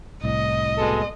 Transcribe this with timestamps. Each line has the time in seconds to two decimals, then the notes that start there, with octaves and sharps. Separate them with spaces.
0.24 C2 A2 D#5
0.77 B2 G#3 A4